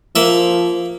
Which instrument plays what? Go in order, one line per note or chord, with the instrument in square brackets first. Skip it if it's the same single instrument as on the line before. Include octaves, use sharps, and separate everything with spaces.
[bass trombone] F3 [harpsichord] A#3 E5